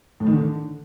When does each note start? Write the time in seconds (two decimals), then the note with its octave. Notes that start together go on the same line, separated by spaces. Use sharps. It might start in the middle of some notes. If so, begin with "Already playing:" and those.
0.20 A2
0.27 D#3
0.33 D3